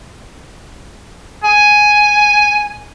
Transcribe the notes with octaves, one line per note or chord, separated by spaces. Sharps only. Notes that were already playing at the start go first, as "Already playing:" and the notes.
G#5